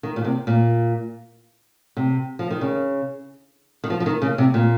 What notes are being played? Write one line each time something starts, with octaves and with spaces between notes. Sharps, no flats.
D#3
A#2
C3
A#2
C3
F3
D#3
C#3
D#3
F3
F3
D#3
C#3
C3
A#2